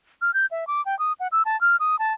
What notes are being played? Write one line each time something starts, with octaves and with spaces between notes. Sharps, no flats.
F6
G6
E5
D6
G5
D#6
F#5
E6
A5
F6
D#6
A5